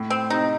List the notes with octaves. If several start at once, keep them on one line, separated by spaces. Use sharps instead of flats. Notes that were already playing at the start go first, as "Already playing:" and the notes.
Already playing: A2
C4
C3 D#4